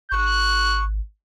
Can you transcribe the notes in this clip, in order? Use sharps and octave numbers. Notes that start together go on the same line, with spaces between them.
G#1 C#6 F#6